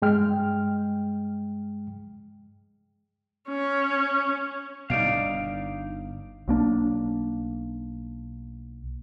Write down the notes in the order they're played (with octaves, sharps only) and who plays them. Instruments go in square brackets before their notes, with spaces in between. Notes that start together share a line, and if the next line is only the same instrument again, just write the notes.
[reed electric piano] G2 G#3 G5 F6
[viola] C#4
[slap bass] B2 G3 A3 [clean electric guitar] D#4 D5 F5
[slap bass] G1 D4
[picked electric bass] B1 A#3 D4